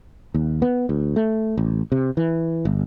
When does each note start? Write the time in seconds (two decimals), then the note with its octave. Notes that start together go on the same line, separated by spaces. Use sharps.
0.34 D#2
0.62 B3
0.89 D2
1.16 A3
1.57 A1
1.92 C3
2.17 E3
2.65 G1